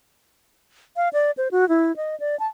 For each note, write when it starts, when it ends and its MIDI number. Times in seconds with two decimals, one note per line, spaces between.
0.96 1.09 77
1.13 1.31 74
1.38 1.48 72
1.51 1.68 66
1.69 1.95 64
1.97 2.18 75
2.20 2.38 74
2.40 2.47 81